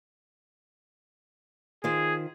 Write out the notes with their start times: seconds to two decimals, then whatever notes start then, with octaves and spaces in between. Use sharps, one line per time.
1.84 D#3 F4 G#4 C5